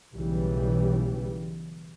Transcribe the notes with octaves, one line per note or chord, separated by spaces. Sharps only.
B1 C#3 E3 G3